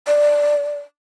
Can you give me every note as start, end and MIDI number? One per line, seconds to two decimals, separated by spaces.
0.07 0.75 74